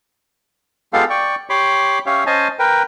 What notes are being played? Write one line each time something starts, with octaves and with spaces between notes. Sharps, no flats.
G#3 B3 F4 G4 A4 F5
D5 G5 C#6
G4 C#5 B5 C6 D6
C#4 G4 C#5 E5 F5
C#4 C5 D#5 G#5 A5
A#4 B4 G5